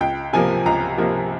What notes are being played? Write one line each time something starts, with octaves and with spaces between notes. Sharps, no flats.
C#2 G5
C3 F3 A#3 G#5
C#2 A#5
C3 F3 A#3